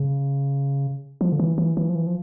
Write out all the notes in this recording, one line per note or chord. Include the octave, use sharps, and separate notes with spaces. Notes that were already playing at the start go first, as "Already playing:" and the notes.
Already playing: C#3
F3
D3
E3
E3
E3
F3
E3
F3